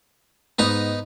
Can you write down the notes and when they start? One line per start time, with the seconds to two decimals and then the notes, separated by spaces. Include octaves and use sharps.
0.59 G#2 B3 D#4 D#5 A#5